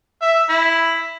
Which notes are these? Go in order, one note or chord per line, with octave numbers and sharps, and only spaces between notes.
E5
E4